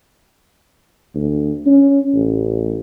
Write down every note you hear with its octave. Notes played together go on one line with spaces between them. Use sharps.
D2
C#4
A1